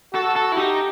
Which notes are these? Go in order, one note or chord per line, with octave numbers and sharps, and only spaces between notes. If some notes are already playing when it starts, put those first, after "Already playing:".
F#4 A4
A4
E4
D#4 G4